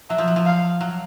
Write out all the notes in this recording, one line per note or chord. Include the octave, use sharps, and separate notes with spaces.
F#3 E5
F3
F#3
F3
F5
F#3